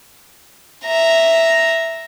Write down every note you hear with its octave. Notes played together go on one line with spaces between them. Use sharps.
E5 A#5